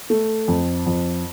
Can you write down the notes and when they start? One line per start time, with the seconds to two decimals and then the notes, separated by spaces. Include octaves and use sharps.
0.10 A3
0.48 F2
0.86 F2